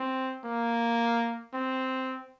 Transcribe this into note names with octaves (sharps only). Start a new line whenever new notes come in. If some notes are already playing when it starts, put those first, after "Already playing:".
Already playing: C4
A#3
C4